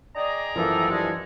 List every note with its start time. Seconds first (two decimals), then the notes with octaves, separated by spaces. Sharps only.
0.15 G#4 D5 D#5 G5 A#5
0.56 F#2 E3 F3 A#3 A4
0.89 G2 G3 G#3 G#4 A4